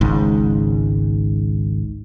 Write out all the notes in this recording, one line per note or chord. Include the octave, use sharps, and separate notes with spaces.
G#1 C#2 G#2